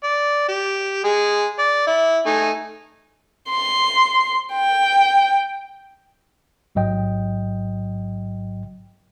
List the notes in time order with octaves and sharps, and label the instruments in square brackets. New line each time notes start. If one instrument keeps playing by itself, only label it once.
[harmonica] D5
G4
G#3 G#4
D5
E4
A3 D#4 G#5
[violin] C6
G5
[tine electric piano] A1 G#2 F#3 D#5 G5